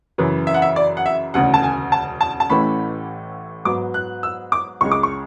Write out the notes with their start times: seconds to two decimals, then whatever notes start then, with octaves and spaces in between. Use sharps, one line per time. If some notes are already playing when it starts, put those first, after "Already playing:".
0.18 F#2 C#3 E3
0.47 E5
0.54 F#5
0.62 E5
0.76 D5
0.97 F#5
1.06 E5
1.34 E1 D2 C#3 F#5
1.54 A5
1.63 G#5
1.92 A5
2.21 A5
2.40 A5
2.50 A1 A2 E3 A3 C#4 B5
3.65 G#2 F#3 B3 D6
3.94 F#6
4.23 E6
4.52 D6
4.81 C#2 C#3 G#3 C#6
4.92 D6
5.03 C#6